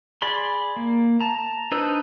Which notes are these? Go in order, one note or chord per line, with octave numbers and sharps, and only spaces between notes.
G#4 D5 B5 C6
A#3
A5 A#5
D4 D#4 B4 C5 E6